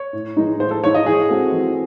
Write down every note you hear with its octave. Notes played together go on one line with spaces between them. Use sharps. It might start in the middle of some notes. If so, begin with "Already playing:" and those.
Already playing: C#5
A2
E3 G#3 D#4
A2 C5
A4
E3 G#3 D#4 C#5
D#5
E3 G#4
G#3 C4 F#4 A4
E3